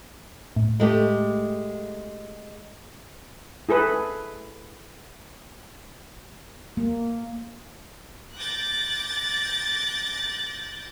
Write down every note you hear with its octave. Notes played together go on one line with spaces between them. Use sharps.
A2
G#3 A3 G4
E4 G#4 A4 B4
A#3
D6 F#6 G6 A6 A#6